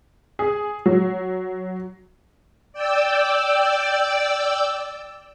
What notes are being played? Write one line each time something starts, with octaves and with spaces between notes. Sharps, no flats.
G#4
F#3
D5 G5 E6